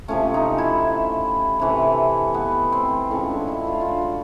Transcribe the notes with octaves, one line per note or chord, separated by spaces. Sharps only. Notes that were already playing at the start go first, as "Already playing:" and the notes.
C3 F3 A3 C#4
D#4
E4
C3 E3 A3
B3
C4
A2 F3 G#3 C#4
D4
E4
F4
F4
F#4